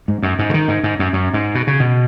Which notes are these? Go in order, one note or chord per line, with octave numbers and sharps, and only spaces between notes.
G#2
F#2
G#2
C#3
D#3
G#2
G#2
F#2
F#2
G#2
B2
C#3
B2